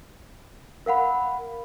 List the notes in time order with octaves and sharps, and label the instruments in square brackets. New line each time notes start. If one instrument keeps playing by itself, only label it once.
[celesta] A#4 F5 F#5 B5